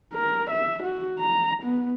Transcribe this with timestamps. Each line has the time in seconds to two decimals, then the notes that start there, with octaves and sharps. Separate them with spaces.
0.14 A#4
0.50 E5
0.82 F#4
1.19 A#5
1.62 B3